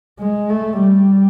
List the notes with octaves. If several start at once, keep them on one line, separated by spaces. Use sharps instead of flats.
G#3
A3
G3